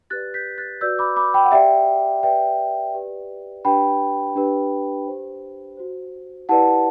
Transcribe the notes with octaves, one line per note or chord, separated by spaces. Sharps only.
G4 B4 D5 F#6 A6
G6 B6
F#6 A6
F#4 B4 D5 E6 G6
B5 D6
B5 D6
G5 B5
F#5
G4 D5 E5 G5
G4 B4 D5 E5 G5
G4 B4 D5
D4 G4 B4 G5 B5
D4 G4 B4
G4 C5
F#4 C5
E4 G4 B4 D5 F#5 A5